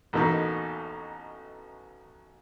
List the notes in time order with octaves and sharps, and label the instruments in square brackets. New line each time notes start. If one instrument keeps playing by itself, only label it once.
[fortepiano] A1 E2 B2 A3 A#3 D#4